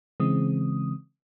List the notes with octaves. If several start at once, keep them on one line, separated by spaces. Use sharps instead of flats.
C#3 E3 G#3 C4 D#6